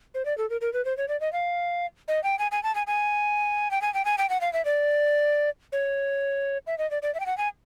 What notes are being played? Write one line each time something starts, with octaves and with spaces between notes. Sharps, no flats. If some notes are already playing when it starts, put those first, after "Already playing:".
C5
D5
A4
A#4
A#4
B4
C5
C#5
D5
D#5
F5
D#5
G5
G#5
G#5
A5
G#5
G#5
G5
G#5
G5
G#5
G5
F#5
F5
E5
D5
C#5
E5
D#5
D5
D5
E5
G5
F#5
G#5